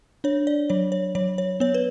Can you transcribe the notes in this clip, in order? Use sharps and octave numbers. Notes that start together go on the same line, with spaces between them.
D4 C#5
D5
F#3 C#5
C#5
F#3 C#5
C#5
B3 C#5
B4